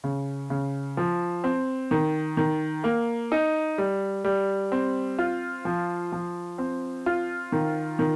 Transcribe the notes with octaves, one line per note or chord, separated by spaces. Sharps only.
C#3
C#3
F3
C4
D#3
D#3
A#3
D#4
G3
G3
C4
F4
F3
F3
C4
F4
D#3
D#3